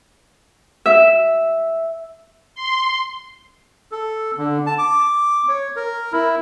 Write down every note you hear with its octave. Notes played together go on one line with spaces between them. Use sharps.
E5
C6
A4
D3
A5
D6
C#5
A#4
E4